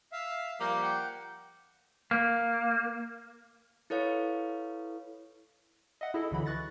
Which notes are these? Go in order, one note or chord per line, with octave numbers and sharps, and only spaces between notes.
E5 F5
F3 G3 A#3 G6
F#5 G5
A#3
E4 A4 B4 C#5 F5
D#5 E5 F#5
E4 G#4 A4 D#5
C#2 D3 E3 F#3 B5
E3 C#6 F#6 A6 A#6